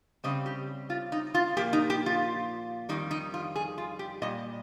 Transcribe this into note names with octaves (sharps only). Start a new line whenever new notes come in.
C#3 G3 C4 D#5
G4
F4
D#4
F4
A#2 F3 A#3 G4
D#4
G4
F4
F2 D#3 G3 D#4
D#4
F4
G#4
F4
G4
A#2 G3 D#5